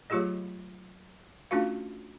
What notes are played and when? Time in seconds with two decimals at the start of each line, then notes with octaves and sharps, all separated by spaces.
0.10 F#3 A3 F4 G4 G#4 D#5
1.51 A3 C#4 D4 F4 F#4 F5